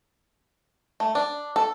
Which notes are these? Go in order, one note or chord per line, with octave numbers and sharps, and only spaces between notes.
A3
D4
A4